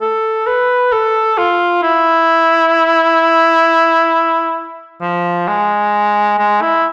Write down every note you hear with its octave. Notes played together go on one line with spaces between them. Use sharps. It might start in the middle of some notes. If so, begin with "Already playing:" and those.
A4
B4
A4
F4
E4
F3
G#3
G#3
E4